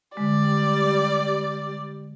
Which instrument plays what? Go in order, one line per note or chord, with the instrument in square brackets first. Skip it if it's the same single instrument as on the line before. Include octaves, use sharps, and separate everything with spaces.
[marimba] D3 G#3 [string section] G3 [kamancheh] D5